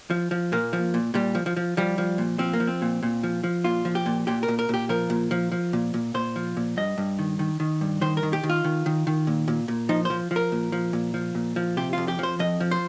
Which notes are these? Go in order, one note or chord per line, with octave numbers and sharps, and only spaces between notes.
F3
F3
A#2 A#3
F3
A#2
A#2 G3
F3
F3
F3
F3 G3
F3
A#2
F3 C4
A#3
F3
C4
A#2
A#2
F3
F3
A#2 F4
F3
G4
A#2
A#2 G4
A#4
A#2
A#4
A#2 G4
F3 A#4
A#2
F3
F3
A#2
A#2
A#2 C5
F3
A#2
G2 D#5
G2
D#3
D#3
D#3
G2
D#3 C5
A#4
D#3
G4
D#3
F4
D#3
D#3
D#3
A#2
A#2
A#2
F3 D#4
F3 C5
F3
A#4
A#2
F3
A#2
F3
A#2
F3
C3 G4
F2 F4
G4
F3 C5
F2 D#5
F3
C5